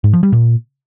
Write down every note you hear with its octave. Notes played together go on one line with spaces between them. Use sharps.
G#2
F3
G3
A#2